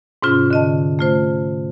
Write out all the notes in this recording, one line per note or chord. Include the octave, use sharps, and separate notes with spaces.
G#2 C3 C#4 F4
D3 D#5 A5
A3 F4 C5